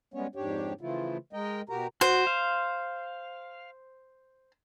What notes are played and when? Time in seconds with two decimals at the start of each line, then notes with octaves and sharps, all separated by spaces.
0.14 G3 G#3 B3 C#4 C#5
0.35 F2 G#2 D4 G4 C#5
0.81 C#3 E3 F3 A3 E4 F4
1.33 G#3 A#4 D#5 G5
1.69 B2 F#4 G4 A#4 A#5
2.01 F#4 C5
2.27 F5